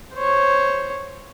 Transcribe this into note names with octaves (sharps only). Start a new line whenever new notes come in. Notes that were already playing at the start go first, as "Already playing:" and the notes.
C5 C#5